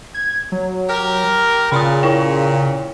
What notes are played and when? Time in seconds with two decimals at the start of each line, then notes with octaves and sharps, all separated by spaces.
0.14 G#6
0.52 F#3
0.89 G4 A#4
1.72 A#2 C#3 B5 C6 D#6
2.03 E4 C#5 G5